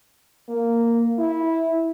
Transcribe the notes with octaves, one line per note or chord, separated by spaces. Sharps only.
A#3
E4